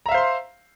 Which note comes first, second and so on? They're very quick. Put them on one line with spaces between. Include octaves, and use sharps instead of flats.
A#5 E5 F5 C5 C6